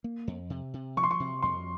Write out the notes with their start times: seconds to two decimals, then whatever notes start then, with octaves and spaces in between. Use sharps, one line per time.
0.04 A#3
0.27 F2
0.50 C3
0.74 C3
0.97 F3 C#6
1.03 C6
1.11 C#6
1.20 C3
1.42 F2 C6